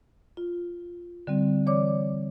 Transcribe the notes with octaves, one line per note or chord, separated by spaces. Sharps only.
F4
D3 G3 C4
E3 C#5 D5 D6